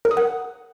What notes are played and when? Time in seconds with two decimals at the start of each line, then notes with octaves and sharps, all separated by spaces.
0.05 A#4
0.11 D#6
0.17 F#5